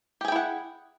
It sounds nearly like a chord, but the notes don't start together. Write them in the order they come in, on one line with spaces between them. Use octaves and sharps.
G4 G#4 G5 E4 F#5